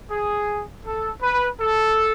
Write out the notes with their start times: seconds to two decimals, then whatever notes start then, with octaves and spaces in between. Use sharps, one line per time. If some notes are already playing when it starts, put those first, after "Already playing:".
0.11 G#4
0.85 A4
1.22 B4
1.60 A4